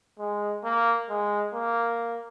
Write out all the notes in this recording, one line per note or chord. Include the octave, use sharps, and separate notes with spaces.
G#3
A#3
G#3
A#3